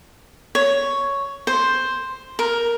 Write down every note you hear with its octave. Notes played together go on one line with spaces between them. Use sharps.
C#5
C5
A#4